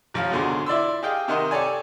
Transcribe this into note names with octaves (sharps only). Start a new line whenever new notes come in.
A1 F3 C#4 F5
G#1 E2 B2 D3 G#4 C6
E4 D5 C6 E6
G4 G#4 D#5 F5 G5
C3 D#3 A#4 D#5 F#5 C6
G4 A4 C#5 D5 G#5